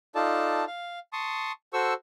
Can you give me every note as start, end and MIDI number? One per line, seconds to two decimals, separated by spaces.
0.15 0.65 63
0.15 0.65 65
0.15 0.65 69
0.15 0.65 74
0.15 0.65 81
0.67 0.99 77
1.13 1.52 81
1.13 1.52 84
1.13 1.52 85
1.13 1.52 87
1.73 1.94 66
1.73 1.94 69
1.73 1.94 72
1.73 1.94 85
1.73 1.94 88